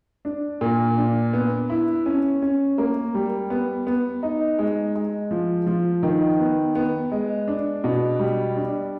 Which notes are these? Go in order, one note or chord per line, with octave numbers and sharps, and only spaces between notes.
D4
A#2
D4
B3
E4
C#4
C#4
A#3
G3
B3
B3
D#4
G#3
G#3
F3
F3
D#3
B3
B3
G#3
D4
B2
G3
D4